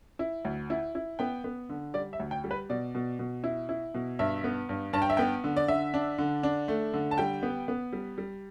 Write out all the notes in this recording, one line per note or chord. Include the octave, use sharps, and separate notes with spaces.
E4
D2
E4
E4
B3 G5
B3
D3
G3 D5
E5
D2
G5
G3
B4
B2 D5
B2
B2
E4
E4
B2
G2 E5
B3
G2
G2 A5
G5
E5
B3 G5
D3
D5
D3 E5
D4
D3
D4
A3
D3
A5
G3 G5
B3
B3
G3
G3